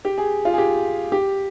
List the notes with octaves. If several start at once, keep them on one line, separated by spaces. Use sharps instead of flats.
G4
G#4
F4
G#4
G4
G4